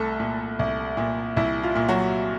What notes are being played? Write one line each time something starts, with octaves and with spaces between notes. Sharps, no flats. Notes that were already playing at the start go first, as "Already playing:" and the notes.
Already playing: C2 A3 A4
A#2
C2
A#2
C2 E4
F4
A#2
F#3 F#4